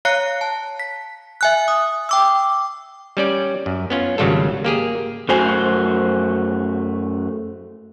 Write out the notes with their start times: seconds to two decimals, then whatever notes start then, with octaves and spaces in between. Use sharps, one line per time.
0.05 C#5 F5 A#5 F#6 C7 C#7
0.41 A5
0.80 B6
1.41 E5 G#5 F#6
1.68 D#6
2.09 G5 D6 E6
3.17 G3 C#4 D5
3.66 F#2
3.90 B3 C#4 F4
4.18 G#1 C#3 F#3 G3 F4 A4
4.65 A#3 G4 G#4
5.29 F#2 A3 F#4 C5 G#5